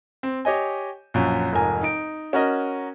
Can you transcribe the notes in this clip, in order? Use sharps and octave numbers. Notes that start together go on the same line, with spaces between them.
C4
G4 C#5 D#5 G#5
A#1 F#2
F1 G#2 A#4 G#5
D#4 D7
C#4 F#4 A#4 D#5